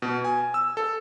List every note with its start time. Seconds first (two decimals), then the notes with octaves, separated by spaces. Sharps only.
0.02 B2
0.24 G#5
0.54 E6
0.77 A4